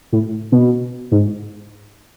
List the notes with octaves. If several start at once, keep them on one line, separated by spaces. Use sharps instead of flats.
A2
B2
G#2